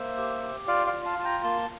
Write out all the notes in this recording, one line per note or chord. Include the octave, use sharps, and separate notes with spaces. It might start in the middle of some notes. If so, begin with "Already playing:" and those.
Already playing: A#3 C5 E5
G4
G4
F4 D5 F5
D5 F5
F4
F5 A5
F4 A5
G5 A#5
A#3 A5 C6